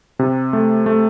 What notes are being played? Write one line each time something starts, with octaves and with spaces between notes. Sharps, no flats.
C3
A3
A3